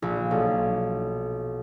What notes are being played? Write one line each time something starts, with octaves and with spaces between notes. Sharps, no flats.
A#1
B1